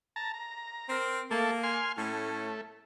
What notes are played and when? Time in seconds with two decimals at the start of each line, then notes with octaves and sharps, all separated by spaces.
0.16 A5 A#5
0.34 A#5
0.89 C4 A#4 C5
1.31 A3 A#3 A4
1.63 G#5 C6 F6
1.97 A2 A3 C#4